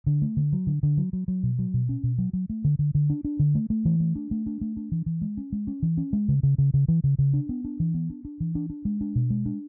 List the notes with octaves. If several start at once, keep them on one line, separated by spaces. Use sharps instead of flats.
D3
A3
D3
F#3
D3
D3
F#3
F#3
F#3
B2
F#3
B2
C#4
B2
F#3
F#3
A3
D3
D3
D3
D4
D4
D3
A3
A3
E3
A3
D4
A3
D4
A3
D4
E3
E3
G#3
C#4
G#3
C#4
E3
C#4
G#3
C#3
C#3
C#3
C#3
E3
C#3
C#3
D4
B3
D4
E3
B3
D4
D4
E3
D4
D4
G#3
D4
B2
G#3
D4